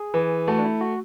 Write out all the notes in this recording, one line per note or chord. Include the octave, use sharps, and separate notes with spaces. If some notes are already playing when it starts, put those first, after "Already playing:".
Already playing: G#4
E3
A3 F#4
D4
E4
F#4